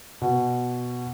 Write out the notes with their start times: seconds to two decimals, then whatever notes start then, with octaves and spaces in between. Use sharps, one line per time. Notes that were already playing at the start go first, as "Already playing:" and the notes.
0.22 B2